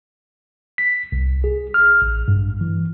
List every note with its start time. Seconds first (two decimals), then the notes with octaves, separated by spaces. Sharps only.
0.78 B6
1.12 C2
1.44 G#4
1.74 F6
2.02 A1
2.28 G2
2.61 E3